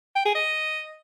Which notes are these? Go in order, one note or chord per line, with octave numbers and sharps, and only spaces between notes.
G5
G#4
D#5